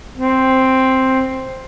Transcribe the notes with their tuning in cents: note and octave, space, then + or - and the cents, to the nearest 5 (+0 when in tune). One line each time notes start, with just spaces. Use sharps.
C4 +5